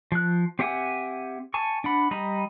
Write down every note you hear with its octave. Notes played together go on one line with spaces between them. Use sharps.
F3 F#6
C4 G4 E5 F#5 G#5
G#5 A5 C#6
D4 F#5 B5
G3 D#5 A#5 B5